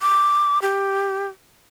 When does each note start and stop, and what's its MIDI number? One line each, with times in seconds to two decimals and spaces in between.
0.01 0.61 86
0.62 1.27 67